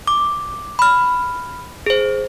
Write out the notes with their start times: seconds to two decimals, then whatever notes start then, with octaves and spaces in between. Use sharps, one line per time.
0.07 D6
0.79 B5 F6
1.86 G#4 C5